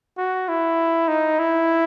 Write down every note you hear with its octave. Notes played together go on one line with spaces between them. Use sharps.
F#4
E4
D#4
E4